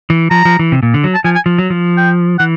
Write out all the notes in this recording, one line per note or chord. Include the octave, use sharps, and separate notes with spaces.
E3
F3 A#5
F3
E3
C3
A#2
D3
F#3
A5
F3 G#5
G#5
F3
F#3
F3
G5
E3 F#5